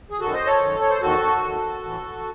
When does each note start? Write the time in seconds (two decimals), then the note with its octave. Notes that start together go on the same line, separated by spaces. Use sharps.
0.10 G#4
0.20 F#2 D#3 F#4 A4
0.34 C5 D#5
0.47 A4 C#5
0.61 F#2 D#3
0.80 C#5
0.90 C5
1.01 E2 D#3 F#4 A4
1.43 E2 D#3
1.84 A2 E3